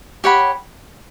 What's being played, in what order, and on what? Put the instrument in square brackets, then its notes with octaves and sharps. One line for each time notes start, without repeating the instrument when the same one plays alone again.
[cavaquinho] G4 C#5 F#5 B5